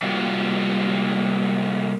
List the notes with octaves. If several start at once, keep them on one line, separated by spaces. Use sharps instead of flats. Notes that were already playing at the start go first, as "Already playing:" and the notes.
C3 G3 G#3 A#3 F4 F#4